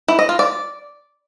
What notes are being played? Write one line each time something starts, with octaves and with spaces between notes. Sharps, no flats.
E4
D#5
F4
D5